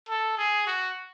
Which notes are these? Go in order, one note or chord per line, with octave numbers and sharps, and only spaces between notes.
A4
G#4
F#4